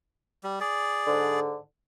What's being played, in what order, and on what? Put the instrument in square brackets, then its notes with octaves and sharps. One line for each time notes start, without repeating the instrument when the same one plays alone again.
[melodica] G3
G#4 D5
[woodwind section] G#2 D3